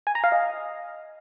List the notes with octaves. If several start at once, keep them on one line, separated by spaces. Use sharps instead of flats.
G#5
A#5
F5
D#5